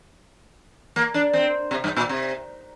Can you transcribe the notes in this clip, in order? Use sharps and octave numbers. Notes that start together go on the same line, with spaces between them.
A#3
D4
C4
C3
G2
A#2
C3